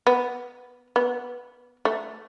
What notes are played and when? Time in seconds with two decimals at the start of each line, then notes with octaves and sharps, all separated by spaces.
0.07 B3
0.96 B3
1.85 A3